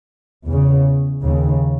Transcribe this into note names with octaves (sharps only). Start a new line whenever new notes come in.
E2 C#3
D#2 C#3